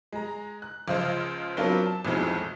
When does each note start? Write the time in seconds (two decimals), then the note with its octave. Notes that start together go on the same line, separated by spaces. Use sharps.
0.12 G#3 A#5
0.62 F#6
0.88 C#2 F3 F4 C5 D#5
1.57 F#3 B3 C4 D4 F4 A#4
1.86 A5
2.05 B1 F2 A2 E3 F3 G#3